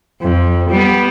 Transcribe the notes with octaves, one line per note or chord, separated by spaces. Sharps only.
F2
G3 B3